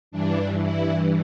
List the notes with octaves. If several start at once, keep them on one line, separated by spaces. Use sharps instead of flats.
G2 E3 D4
E4